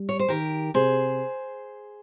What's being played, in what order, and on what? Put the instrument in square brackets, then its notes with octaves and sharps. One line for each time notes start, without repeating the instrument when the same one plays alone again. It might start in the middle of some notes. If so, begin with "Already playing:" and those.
Already playing: [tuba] G3
[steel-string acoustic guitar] C#5
C5
[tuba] D#3 [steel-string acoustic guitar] G4 A#4
[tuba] C3 [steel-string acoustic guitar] G#4 C5